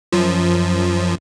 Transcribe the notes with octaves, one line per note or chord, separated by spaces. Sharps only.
F#2 F3